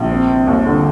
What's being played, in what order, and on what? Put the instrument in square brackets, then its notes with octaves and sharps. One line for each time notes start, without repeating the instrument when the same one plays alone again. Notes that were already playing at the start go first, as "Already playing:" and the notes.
Already playing: [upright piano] A#1
C4
C4
D#2
D3